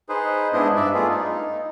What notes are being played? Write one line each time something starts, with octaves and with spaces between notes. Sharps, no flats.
D#4 G#4 B4 C5
G#2 B3 D4 E4 D#5
G2 D5 E5
A3 B3 F4 G#4
D#4